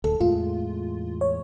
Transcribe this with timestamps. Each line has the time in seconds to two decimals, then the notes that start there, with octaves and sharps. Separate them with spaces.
0.04 D1 D2 A4
0.20 E2 A2 G#3 F4
1.21 C#5